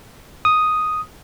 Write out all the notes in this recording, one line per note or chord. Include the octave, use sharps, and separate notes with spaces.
D#6